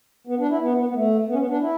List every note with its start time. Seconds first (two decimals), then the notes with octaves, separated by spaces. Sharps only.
0.27 B3
0.39 D4
0.50 E4
0.61 B3
0.77 B3
0.89 B3
0.94 A3
1.27 B3
1.33 C#4
1.38 B3
1.49 D4
1.60 E4